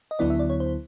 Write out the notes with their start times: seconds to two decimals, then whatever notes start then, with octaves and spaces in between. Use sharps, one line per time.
0.11 D#5
0.19 D2 D3 F#3 B3 E4 D5
0.30 E5
0.39 D5
0.50 C#5
0.60 C5